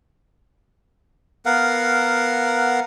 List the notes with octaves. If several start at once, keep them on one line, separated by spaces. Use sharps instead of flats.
B3 A#4 F5 F#5